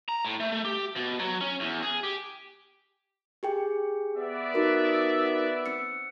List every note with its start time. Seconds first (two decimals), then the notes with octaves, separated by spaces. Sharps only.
0.08 A#5
0.25 A2
0.40 A3
0.52 A3
0.65 G4
0.96 B2
1.20 F#3
1.41 C#4
1.60 E2
1.82 G#4
2.03 G4
3.43 G4 G#4 G5
4.16 B3 D5 E5
4.54 D#4 F#4 A#4
5.66 C4 E6 C#7